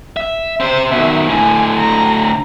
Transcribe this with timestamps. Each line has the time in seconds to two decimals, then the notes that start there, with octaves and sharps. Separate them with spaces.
0.16 E5
0.60 C4 C5 E5
0.91 B2 D#3 E5
1.29 A2 D3 G#5
1.77 A#5